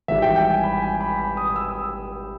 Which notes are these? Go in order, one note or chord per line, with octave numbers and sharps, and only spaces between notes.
G#1 G#2 E3 G3 E5
G5
G5
G#5
B5
G#5
B5
B5
D#6
D#6
E6